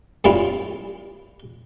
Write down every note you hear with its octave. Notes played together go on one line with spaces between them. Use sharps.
F#2 A2 G3 E4 F4